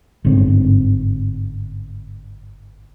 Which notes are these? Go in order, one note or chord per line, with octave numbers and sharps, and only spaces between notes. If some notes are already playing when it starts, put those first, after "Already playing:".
G1 G#2 D3 C4